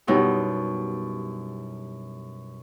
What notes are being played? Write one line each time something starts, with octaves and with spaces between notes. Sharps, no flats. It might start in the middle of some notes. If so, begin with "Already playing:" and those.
F#2 B2 G3 D#4 E4